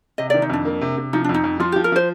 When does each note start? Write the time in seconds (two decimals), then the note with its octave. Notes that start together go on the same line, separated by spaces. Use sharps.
0.18 C3 D#5
0.30 D#3 D5
0.42 D#4
0.50 F2 D4
0.65 A#3
0.81 C3
0.97 C3
1.13 F3 D#4
1.24 D4
1.29 F2
1.34 D#4
1.44 F2
1.60 F3 F4
1.72 F3 G4
1.84 A#4
1.92 F3 C5